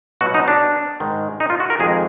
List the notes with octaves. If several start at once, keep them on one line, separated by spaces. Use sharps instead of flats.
B2 F#3 F#4
D#4
D4
G#2 D#3 G#3
D#4
F4
F#4
A#4
F2 D#3 G#3 G#4